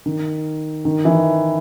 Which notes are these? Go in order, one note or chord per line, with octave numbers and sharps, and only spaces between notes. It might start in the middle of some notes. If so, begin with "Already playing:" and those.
D#3
D#3
E3